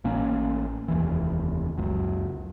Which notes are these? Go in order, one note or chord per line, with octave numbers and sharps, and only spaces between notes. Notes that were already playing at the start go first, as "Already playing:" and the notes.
A1 A#3 C#4
F1 D#2 E3
C#2 F#2